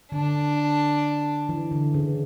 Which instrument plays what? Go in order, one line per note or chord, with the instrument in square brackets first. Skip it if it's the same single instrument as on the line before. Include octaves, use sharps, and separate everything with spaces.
[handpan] D3 [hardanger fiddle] D4
[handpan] E3
D3
C#3